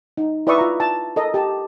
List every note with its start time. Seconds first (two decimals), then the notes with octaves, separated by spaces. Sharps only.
0.17 D#4
0.47 E4 B4 D5 E5 C#6 D#6
0.58 F4 A#5
0.80 A5
1.16 A4 A#4 D#5
1.34 G4 A5